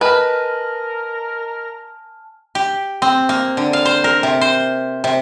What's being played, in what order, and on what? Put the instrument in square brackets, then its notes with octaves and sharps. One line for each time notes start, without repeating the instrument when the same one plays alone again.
[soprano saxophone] A#4 [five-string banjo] B4 [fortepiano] D#5 B5 [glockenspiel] G#5 A5 F6
[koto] G4
C4
A#3
D3
F5
C5
A#4
C3
C5
C3